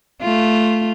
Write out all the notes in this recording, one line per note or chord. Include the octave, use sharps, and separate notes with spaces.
A3 F4